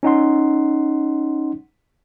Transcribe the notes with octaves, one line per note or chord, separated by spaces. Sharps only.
C#4 D#4 F#5 C6